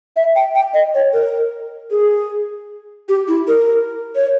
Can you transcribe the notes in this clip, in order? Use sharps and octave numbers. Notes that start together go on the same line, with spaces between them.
E5
G5
G5
D#5
C#5
A#4
G#4
G4
E4
A#4
C#5